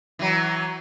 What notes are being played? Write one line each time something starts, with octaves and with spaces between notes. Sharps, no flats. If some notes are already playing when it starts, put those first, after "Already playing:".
E3 F#3